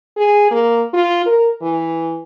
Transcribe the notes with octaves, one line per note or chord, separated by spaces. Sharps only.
G#4
A#3
F4
A#4
E3